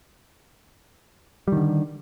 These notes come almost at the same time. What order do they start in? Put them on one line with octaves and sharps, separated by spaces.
G3 D#3 D3